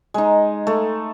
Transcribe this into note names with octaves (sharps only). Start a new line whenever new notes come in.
G#3 D#4
A3